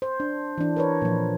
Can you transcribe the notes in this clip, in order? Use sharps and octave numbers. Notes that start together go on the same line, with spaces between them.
C5
D4
E3 D4
A#4 B4 C#5
A#2 F3